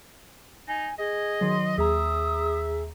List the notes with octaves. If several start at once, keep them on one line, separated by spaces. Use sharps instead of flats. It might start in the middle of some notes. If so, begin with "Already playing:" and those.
D#4 G#5
G#4 D#5
D#3 F#3 C6
D#2 G#4 E5 A#5 D#6